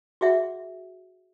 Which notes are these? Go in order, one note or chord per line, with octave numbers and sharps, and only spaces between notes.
F#4 G#4 E5 F#5